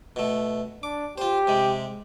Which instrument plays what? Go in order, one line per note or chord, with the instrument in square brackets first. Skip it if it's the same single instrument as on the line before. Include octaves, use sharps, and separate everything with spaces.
[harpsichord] B2 A3
[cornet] D4 [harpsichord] D6
[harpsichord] F4 C5 [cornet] G4
[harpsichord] C3 G#3